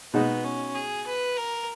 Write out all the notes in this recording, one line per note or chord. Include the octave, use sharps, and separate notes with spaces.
B2 G#3 B3 D#4 F#4
C#4
G#4
B4
A#4